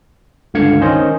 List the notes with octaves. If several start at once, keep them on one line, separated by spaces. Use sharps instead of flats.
C#2 G2 D3 F5 G#6 C#7
D#3 C#4 C5 D#5